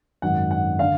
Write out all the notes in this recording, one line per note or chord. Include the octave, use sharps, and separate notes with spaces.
G#1 F#2 D#3 F#5
F#5
D3 F5